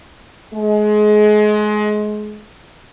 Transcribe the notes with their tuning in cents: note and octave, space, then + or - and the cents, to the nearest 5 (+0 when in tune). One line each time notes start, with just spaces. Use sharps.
G#3 +25